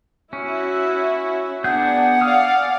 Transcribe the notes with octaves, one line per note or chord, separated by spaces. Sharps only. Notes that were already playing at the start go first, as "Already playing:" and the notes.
C#4 E4 F#4 E5
B3 D4 G#4 F#5 G6
D5 F5 G#5 D#6 F6